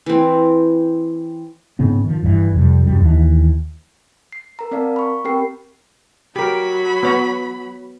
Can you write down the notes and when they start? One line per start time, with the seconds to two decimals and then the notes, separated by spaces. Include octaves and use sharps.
0.06 E3 C4
1.79 G#2 C#3 B3 C4
2.04 D#3 F3
2.22 G1 G2 B2 E3
2.54 F2 C3 G3
2.85 C2 F#2 G3
3.00 D#2 E3
4.33 C7
4.59 A#4 A#5
4.71 C4 A#4 D5 F5 A5
4.96 B5 C#6
5.25 C4 G4 A#4 G5 C7
6.36 F#3 G4 A#4 B5
7.03 B3 C#5